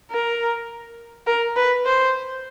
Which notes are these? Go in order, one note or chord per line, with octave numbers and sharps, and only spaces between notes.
A#4
A#4
B4
C5